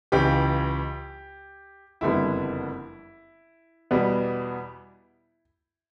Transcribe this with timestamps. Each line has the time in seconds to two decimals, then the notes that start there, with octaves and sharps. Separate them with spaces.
0.12 C#2 C#3 E3 G4
2.01 F#1 F2 D3 G3 B3 E4
3.91 E2 B2 G3 B3